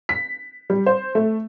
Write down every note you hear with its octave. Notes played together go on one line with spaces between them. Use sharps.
B6
G3
C5
A3